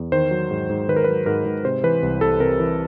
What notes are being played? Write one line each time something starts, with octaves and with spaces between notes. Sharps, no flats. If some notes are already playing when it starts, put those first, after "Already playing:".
Already playing: E2
D#3 C5
F#3
G#2
G#2
D#3 B4
A#4
F#3 B4
G#2 A#4
G#2
C3 C5
E3 B4
C2
C2 A4
C3 A#4
E3